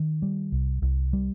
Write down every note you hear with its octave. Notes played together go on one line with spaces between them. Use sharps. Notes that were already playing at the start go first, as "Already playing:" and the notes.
Already playing: D#3
G3
C2
C2
G3